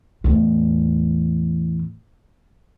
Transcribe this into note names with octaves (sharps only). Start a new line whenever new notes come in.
E2 A2